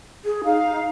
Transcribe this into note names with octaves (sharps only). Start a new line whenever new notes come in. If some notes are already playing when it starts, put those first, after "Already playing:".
G#4
D#4 F5